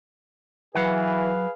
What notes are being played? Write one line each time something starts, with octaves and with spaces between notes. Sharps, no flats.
E3 F#3 G#4 B4 F5 F#5